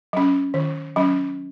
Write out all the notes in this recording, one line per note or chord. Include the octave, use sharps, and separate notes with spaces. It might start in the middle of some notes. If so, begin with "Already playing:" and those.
F#3 C#4
D#3
F#3 C#4